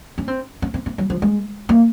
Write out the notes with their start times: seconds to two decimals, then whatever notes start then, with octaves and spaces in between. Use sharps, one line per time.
0.18 C#4
0.28 C4
0.62 C#4
0.74 C4
0.86 C4
0.98 F#3
1.10 F3
1.22 G#3
1.69 A#3